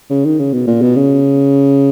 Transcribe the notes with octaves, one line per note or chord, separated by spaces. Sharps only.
C#3
D#3
C#3
B2
A#2
B2
C#3